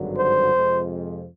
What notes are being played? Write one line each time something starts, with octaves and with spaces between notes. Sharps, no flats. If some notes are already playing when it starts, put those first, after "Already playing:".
Already playing: G#1 G2 D3 F#3
C5
F2 C3 F3 G#3